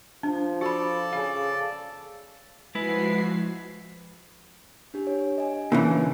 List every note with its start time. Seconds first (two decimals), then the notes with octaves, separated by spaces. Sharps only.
0.23 F3 D4
0.61 F#4 A4 D5 A5 B5
1.13 C#3 F5
2.75 F3 G#3 E4 F#4 B4 C7
4.94 D4 G4
5.07 C#5
5.38 D#5 G#5
5.72 A#2 C#3 E3 D4 G#5 A5